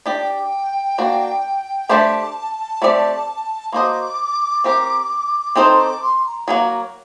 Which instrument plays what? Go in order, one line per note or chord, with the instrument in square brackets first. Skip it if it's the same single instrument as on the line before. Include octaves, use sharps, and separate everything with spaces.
[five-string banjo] D4 G4 D5 [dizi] G5
[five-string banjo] A#3 D4 F#4
[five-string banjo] A3 D4 G4 C5 [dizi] A5
[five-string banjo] A3 C4 G4 D5
[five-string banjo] A#3 F#4 C5 D#5 [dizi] D6
[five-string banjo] C4 G4 A#4
[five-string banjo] C4 D#4 A4 C5 [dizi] C6
[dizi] D6
C6
A#5
[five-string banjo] F#3 A#3 F#4